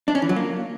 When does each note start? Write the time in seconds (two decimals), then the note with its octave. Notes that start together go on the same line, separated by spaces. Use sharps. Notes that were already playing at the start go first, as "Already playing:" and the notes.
0.08 D4
0.15 C#4
0.22 E3
0.29 F#3
0.36 A#3